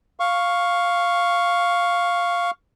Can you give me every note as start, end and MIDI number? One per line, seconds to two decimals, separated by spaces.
0.20 2.51 77
0.20 2.51 85